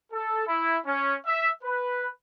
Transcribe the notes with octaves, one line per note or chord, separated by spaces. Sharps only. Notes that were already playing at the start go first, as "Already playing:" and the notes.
A4
E4
C#4
E5
B4